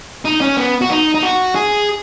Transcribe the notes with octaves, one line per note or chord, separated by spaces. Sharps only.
D#4
C#4
B3
F#4
D#4
D#4
F#4
G#4